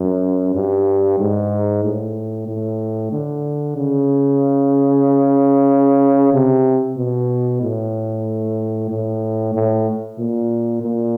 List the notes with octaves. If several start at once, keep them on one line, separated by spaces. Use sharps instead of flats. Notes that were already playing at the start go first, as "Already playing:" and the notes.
Already playing: F#2
G2
G#2
A2
A2
D3
C#3
C3
B2
A2
A2
A2
A#2
A#2